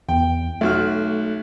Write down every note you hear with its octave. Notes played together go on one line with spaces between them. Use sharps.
E2 G5
B1 A3 F#4 F6